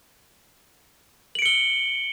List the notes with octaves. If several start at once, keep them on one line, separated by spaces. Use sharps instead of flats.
C#7 D7 F#7 G7